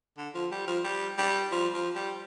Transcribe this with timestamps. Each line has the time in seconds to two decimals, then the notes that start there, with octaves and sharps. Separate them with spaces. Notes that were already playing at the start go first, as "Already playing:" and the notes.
0.18 D3
0.35 F3
0.51 G3
0.67 F3
0.84 G3
1.18 G3
1.52 F3
1.74 F3
1.95 G3